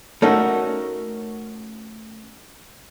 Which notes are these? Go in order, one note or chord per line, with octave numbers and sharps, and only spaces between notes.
A3 C#4 D#4 F#4 A#4 E5